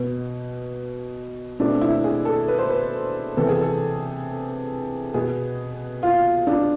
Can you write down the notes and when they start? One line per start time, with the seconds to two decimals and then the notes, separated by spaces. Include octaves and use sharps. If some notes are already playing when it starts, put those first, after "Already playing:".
Already playing: B2 B3
1.59 B2 A3 C4 D4
1.81 E4
2.04 G#4
2.25 A4
2.48 B4
2.59 C5
2.70 B4
3.37 C3 E3 B3 A4
3.49 G#4
3.61 A4
5.14 B2 B3 G#4
6.03 F4
6.47 D4